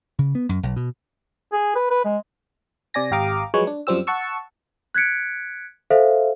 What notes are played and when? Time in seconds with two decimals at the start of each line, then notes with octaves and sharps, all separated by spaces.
0.19 C#3
0.35 B3
0.49 F#2
0.63 B1
0.76 B2
1.53 G#4
1.75 B4
1.91 B4
2.05 G#3
2.94 C3 D5 G#5 A#6
3.11 G#1 G4 F5 A#5 D6 D#6
3.54 F3 F#3 G#3 B4 C#5
3.67 D4
3.87 F#2 F3 G3 C4 G4 E6
4.07 F#5 A5 C#6 E6
4.95 F#6 G#6 B6 C#7 D7
5.90 A4 C5 E5 F5